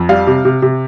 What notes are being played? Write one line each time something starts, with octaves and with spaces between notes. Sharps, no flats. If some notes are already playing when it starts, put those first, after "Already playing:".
Already playing: F2
G3 F5
C3
C3
C3